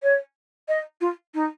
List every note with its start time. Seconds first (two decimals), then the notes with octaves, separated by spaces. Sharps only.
0.03 C#5
0.68 D#5
1.01 F4
1.34 D#4